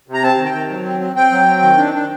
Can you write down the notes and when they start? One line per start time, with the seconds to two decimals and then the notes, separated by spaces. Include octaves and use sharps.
0.08 C3
0.14 A#5
0.23 C4 A5
0.38 D#3
0.46 G5
0.54 D#3
0.70 F#3
0.85 C4
1.01 C4
1.16 C4 G5
1.32 F#3
1.48 C4
1.62 D#3
1.78 D4
1.94 D4